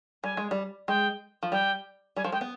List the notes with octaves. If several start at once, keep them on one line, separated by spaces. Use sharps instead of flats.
G3 G#5
G#3
G3
G#3 G5
F3
G3 G5
G3 G#5
F3
G#3 G5
B3